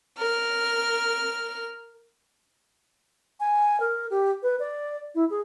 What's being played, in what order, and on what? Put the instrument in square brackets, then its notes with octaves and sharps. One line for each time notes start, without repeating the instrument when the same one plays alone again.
[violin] A#4 F6
[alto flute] G#5
A#4
G4
B4
D5
E4
G#4